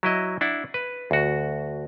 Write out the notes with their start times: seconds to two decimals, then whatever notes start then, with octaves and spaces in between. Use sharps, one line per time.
0.03 F#3 E4 D#5
0.41 D4 E4 F#5
0.74 B4
1.11 D2 F#4